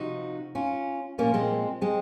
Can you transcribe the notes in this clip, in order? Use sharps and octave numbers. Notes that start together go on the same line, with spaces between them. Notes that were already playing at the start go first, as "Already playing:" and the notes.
Already playing: C3 F3 D#4 F#4
C#4 F4
A#2 F3 A#3 C#4
G#3 C4
G#3 C4